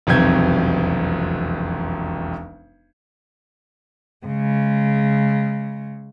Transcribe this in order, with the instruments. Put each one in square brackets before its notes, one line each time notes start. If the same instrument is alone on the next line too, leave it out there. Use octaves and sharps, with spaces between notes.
[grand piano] E1 B1 F2 C3 G6 G#6
[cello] C#3 G#3